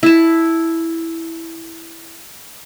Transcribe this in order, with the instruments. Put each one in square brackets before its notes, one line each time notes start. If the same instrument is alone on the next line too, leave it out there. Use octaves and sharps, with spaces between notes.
[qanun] E4 A5